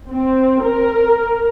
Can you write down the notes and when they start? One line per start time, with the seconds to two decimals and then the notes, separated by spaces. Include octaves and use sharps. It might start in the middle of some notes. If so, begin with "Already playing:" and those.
0.11 C4
0.65 A#4